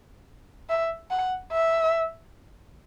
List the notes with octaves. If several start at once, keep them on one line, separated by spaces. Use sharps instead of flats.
E5
F#5
E5